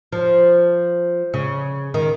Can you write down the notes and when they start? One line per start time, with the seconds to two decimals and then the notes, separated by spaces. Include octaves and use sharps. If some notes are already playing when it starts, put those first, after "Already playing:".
0.12 F3
1.34 C#3
1.94 D#3